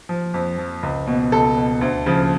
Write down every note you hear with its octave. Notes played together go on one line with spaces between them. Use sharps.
F3
F2
F3
C#2
B2
C#2 A4
B2
D2
C#3 F3